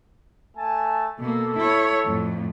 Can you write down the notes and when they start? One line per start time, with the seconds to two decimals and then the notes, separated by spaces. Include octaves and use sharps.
0.56 A3 G#5 A5
1.19 B2 A#3 A4
1.58 E4 C#5
2.05 F2 A2